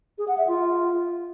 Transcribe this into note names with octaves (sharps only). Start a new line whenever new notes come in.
G#4
F#5
E5
F4